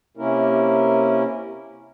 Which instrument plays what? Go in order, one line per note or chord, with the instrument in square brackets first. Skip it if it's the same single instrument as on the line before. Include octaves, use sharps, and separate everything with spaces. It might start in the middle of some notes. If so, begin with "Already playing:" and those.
[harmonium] C3 A#3 C#4 E4 A#4